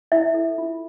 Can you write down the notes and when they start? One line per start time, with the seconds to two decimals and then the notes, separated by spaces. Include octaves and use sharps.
0.12 E4 E5
0.34 A4
0.58 F4